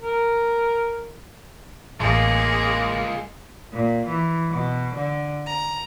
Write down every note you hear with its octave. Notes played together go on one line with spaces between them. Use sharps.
A#4
A1 G#3 A#3 F4 G#4
A#2
E3
B2
D3
A#5